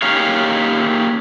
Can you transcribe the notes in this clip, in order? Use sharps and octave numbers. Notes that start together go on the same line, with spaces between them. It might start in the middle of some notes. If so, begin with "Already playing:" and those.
A#3 C#4 D#4 G4 C#5 F5